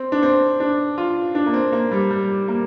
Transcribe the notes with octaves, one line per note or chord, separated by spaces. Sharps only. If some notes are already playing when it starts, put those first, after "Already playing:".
Already playing: C4
D4
C4
D4
F4
D4
A#3
C4
A#3
G3
G3
A#3